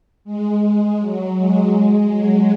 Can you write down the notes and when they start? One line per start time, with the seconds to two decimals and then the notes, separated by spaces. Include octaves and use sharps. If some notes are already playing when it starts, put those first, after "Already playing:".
0.25 G#3
0.62 G#3
0.99 F#3
1.37 G#3
1.73 G#3
2.11 F#3